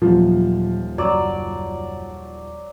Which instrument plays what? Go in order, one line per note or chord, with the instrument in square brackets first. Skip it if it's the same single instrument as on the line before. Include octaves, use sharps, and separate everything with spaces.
[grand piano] D#1 F3 [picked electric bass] A#2 F#3
[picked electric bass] F#1 [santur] F#3 D5